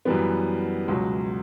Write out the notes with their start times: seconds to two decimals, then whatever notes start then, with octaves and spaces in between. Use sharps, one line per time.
0.05 F#2 E3 G3 B3
0.88 C#2 B2 F#3